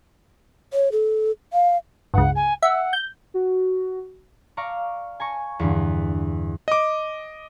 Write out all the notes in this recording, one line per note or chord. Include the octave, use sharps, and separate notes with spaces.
C#5
A4
F5
G1 C#2 F#5
G#5
E5 F#5
G6
F#4
D5 F5 A#5 C#6
G#5 A#5 C#6
E2 G2 D3
D#5 D6